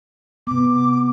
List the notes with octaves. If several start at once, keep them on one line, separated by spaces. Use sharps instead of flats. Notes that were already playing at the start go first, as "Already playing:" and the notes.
C3 B3 D6